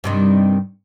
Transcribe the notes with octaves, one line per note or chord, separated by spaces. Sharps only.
G2 C3 D#3